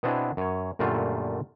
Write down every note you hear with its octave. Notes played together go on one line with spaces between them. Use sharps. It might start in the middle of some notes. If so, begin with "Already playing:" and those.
B2 B3 C4 D4 E4 G#5
F#2 C#5
F#2 A#2 D3 G3 A3 F4